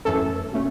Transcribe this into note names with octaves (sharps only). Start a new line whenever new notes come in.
F#2 E3 A3 C#4 A4
B2 A3 C#4